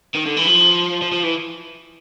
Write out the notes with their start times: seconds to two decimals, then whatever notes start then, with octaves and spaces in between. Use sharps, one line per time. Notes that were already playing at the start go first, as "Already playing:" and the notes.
0.15 D#3
0.26 D3
0.37 E3
0.47 F3
1.02 F3
1.12 F3
1.23 E3